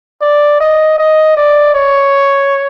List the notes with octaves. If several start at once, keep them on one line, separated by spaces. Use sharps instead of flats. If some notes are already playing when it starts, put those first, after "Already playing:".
D5
D#5
D#5
D5
C#5